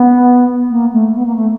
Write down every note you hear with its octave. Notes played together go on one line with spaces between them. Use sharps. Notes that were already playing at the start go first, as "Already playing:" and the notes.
Already playing: B3
A#3
A3
B3
A#3
A3